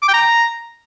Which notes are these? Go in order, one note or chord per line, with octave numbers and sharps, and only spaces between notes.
D6
G5
A#5